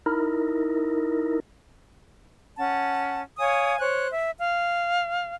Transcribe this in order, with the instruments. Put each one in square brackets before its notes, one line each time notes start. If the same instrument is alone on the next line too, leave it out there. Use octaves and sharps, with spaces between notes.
[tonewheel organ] D#4 E4 A#4
[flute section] C#4 F#5 A5
C#5 F5 G#5 D#6
C5 C#5 F#6
E5
F5